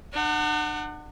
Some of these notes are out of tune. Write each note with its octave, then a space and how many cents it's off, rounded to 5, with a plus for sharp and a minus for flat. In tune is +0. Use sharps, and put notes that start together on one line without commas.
D4 +45 F#5 +0